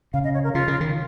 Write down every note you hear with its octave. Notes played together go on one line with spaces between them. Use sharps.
C#3 F5
D#5
C#5
A#4
C#3 F4
C#3
D#3